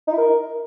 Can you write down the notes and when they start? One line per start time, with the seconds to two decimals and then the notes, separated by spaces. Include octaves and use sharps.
0.07 D#4
0.12 E4
0.18 A#4